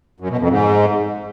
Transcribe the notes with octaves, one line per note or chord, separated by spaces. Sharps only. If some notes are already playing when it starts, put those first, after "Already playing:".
F#2
B2
F2
G#2